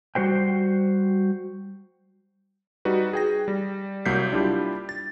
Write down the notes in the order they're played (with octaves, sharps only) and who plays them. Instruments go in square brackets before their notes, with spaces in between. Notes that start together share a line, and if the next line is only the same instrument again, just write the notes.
[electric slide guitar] G3 F#4 C5 G5
[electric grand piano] G3 D#4 F#4 B4
G#4 G5 A#6
G3
C2 F#3 A#3 G6 B6 C7
G3 D4 E4 F4 G4
A6